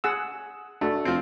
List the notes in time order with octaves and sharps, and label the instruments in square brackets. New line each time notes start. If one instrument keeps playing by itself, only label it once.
[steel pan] G#4 F#5 E6
[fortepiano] A3 [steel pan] D4 F#4
[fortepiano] F3 C4